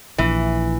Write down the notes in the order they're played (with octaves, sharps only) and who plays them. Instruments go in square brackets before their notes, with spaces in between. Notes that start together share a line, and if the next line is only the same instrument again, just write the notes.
[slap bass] A#1 [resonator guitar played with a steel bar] E3